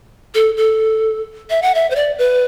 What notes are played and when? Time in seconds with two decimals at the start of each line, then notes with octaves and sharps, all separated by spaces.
0.35 A4
0.57 A4
1.50 E5
1.62 F#5
1.75 E5
1.90 C5
1.96 D5
2.18 B4